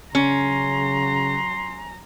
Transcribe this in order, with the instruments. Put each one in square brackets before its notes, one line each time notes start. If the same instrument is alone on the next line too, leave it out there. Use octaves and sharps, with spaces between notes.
[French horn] C#3 [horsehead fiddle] F#3 A#5 [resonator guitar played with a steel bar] C#4 [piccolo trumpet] C6